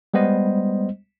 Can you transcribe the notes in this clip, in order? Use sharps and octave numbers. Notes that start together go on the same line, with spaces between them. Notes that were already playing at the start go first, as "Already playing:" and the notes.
G3 G#3 B3 C5 D#5